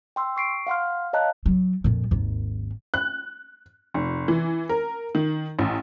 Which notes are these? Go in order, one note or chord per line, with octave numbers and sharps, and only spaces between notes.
G5 C6 E6
C#6 C7 D7
F5 F#5 C6 F6
C#5 D#5 F5 A5 A#5 F#6
F#3
F2 A#2
G#1 D#2
F#6
F1
E3
A#4
D#3
A1